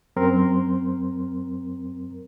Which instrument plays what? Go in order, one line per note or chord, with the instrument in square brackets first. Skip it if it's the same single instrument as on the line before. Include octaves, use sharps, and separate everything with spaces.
[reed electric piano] F#2 C4 A#4 C6